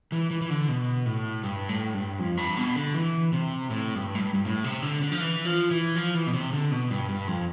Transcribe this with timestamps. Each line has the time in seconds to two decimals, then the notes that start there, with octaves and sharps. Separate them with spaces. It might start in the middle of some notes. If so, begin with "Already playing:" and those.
0.12 E3
0.31 E3
0.41 E3
0.50 D3
0.68 B2
1.06 A2
1.43 G2
1.69 A2
1.94 G2
2.19 F2
2.37 G2
2.57 B2
2.76 D3
2.94 E3
3.33 C3
3.70 A2
3.95 G2
4.15 A2
4.20 G2
4.34 G2
4.45 A2
4.64 C3
4.82 D3
5.02 D3
5.12 F3
5.20 E3
5.45 F3
5.71 E3
5.96 F3
6.15 E3
6.27 B2
6.33 C3
6.52 D3
6.71 B2
6.90 G2
7.09 G2
7.27 F2